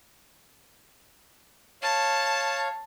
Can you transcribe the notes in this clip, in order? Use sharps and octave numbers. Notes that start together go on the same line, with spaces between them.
C#5 F5 A5